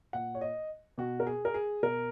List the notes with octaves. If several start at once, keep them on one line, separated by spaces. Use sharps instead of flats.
A#2 F#5
C#5
D#5
B2 F#4
A#4
G#4
A#4
G#4
B2 A#4